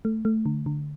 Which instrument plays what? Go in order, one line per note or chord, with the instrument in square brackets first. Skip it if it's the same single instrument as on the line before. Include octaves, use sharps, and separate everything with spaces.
[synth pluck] A3
A3
D3
D3